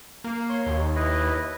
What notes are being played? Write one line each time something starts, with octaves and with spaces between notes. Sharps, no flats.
A#3
C#5 C6
D#2
E4 B4 D#5